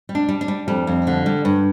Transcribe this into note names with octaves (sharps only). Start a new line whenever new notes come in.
G3
D4
G3
D4
G3
F2 G3
F2
D3
G3
G2